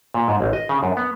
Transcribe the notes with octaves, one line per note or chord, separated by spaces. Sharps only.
A#2
G#2
A1
D#5
C#3
F#2
B3